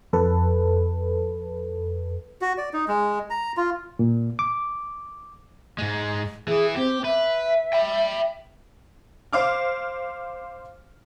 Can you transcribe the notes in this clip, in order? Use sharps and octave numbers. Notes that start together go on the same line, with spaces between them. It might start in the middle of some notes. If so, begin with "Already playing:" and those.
F2 A4 B4
F#4
D5
D#4
G#3
A#5
F4
A#2
D6
G#2 G#3
E3 E4 G#4
C4 G4
B4 E5
G5 B5
C5 F5 D6 F6